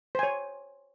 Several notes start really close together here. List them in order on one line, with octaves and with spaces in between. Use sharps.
C5 G#5 C#5